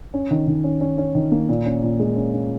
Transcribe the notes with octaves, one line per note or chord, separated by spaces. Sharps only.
C#4
D#3
D#3
C#4
C#4
C#4
D#3
A#3
A#2
C#4
A#2
G#3
C#4
C#4